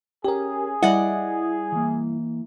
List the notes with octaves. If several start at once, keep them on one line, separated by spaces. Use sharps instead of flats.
C#4 G4 G#4 A#4
G3 E4 D5 D#5 F#5
E3 A#3